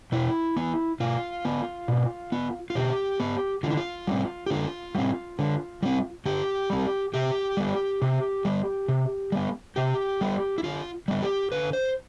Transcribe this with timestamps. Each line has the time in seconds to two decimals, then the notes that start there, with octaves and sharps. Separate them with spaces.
0.12 B2 E4
0.57 B3
1.00 B2 F4
1.45 B3
1.88 B2
2.32 B3
2.70 F4
2.75 B2 G4
3.20 B3
3.63 D3 F4
3.70 E4
3.77 F4
4.07 G3 C4
4.47 G4
4.50 D3 F4
4.95 G3 C4
5.39 D3
5.83 G3 C4
6.26 D3 G4
6.70 G3 C4
7.14 C3 G4
7.57 G3 B3
8.02 C3
8.45 G3 B3
8.88 C3
9.32 G3 B3
9.76 C3 G4
10.21 G3 B3
10.58 E4
10.64 D3 F4
11.08 G3 B3
11.22 G4
11.52 D3 B4
11.73 C5